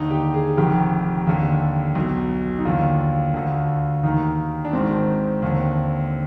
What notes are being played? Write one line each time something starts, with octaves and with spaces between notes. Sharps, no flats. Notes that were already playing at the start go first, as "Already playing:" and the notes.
Already playing: D#2 D3 D#4
G4
G#4
F1 F2 D#3 G4
D#2 D3
B1 B2
D#4
D#2 D3 F4
D2 D3
D#2 D#3 D#4
D4
G#1 G#2 D#3 C4
D#2 D3